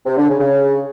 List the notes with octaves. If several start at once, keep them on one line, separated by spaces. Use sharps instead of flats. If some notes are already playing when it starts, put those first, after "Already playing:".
C3
D3
C#3
C#3